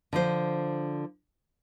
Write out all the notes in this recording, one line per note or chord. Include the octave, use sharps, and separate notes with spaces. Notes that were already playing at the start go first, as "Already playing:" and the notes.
D3 F3 C5